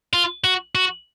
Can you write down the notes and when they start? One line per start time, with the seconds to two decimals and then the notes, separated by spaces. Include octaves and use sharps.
0.14 F4
0.44 F#4
0.75 F#4